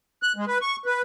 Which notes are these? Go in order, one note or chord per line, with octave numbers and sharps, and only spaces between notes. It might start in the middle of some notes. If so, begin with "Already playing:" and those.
F#6
G#3
B4
C#6
B4